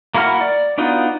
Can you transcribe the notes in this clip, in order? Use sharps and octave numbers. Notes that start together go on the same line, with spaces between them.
A#3 E4 F#4 A#4 F6
D5
B3 D4 D#4 F4 F#4